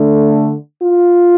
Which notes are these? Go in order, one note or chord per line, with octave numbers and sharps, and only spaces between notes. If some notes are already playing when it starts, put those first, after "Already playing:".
Already playing: D3 A3 D4
F4